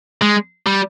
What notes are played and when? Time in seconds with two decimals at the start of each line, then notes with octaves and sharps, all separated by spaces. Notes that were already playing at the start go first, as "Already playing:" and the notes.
0.21 G#3
0.67 G3